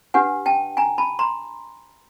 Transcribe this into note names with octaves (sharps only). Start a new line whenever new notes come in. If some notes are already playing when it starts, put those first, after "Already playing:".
D4 G4 B4 F#5 G#5
G5 A5
G#5 A#5
A5 B5
A#5 C6